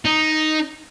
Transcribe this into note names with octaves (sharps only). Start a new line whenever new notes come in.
D#4